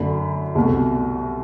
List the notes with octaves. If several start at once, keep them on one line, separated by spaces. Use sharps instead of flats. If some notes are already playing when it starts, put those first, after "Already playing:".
Already playing: F#2 D3 A3 B5
C2 B2 A3